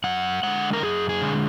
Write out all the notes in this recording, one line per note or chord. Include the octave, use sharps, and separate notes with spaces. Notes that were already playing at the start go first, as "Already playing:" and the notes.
F#2 F#5
D3 G#3 F#5
A#4
F#2 G#4
G#4
D3 G#3